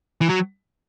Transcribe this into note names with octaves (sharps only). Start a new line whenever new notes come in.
E3
F#3